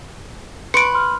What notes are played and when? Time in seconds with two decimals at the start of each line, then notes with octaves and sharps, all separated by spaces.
0.74 B4 C6 C#6 C#7 D7
0.94 C6 F6